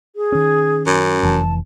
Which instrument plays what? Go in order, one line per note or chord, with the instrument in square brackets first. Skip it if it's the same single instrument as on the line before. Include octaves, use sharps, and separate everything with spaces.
[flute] G#4
[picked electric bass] D#3 C#4
[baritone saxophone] F#2
[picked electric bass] F1 E3 [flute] A5